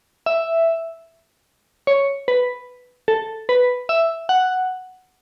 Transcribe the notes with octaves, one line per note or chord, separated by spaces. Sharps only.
E5
C#5
B4
A4
B4
E5
F#5